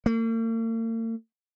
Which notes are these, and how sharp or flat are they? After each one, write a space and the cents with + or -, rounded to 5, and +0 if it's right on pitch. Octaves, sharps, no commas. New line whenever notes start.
A#3 -45